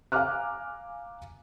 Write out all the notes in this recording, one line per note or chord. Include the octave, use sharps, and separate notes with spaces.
F5 G#5 A#5 D6 F6 F#6